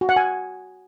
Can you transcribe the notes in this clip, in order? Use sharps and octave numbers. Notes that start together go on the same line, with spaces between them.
F#4
F#5
G#5